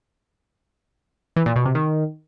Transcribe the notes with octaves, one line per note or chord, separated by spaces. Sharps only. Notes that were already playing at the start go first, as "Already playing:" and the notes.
E3
A#2
B2
C3
D#3